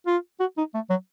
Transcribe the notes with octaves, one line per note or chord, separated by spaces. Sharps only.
F4
F#4
D#4
A3
F#3